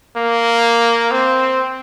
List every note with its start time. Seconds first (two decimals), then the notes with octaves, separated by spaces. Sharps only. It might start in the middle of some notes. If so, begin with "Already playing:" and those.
0.16 A#3
1.11 C4